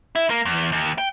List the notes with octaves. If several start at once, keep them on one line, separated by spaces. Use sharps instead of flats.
E4
A#3
E2
D#2
G5